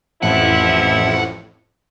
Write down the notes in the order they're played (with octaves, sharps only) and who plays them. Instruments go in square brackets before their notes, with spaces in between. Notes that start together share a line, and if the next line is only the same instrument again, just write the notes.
[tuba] A1 [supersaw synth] F2 A2 [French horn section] F3 E4 [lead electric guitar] F#5